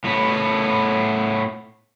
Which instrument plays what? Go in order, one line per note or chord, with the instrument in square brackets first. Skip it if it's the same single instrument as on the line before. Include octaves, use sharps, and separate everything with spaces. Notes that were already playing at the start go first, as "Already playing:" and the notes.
[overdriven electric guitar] A2 B3